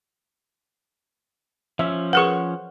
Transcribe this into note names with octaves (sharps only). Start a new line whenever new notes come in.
F3 C#4 E5
G#4 A#4 B4 F#5 C#6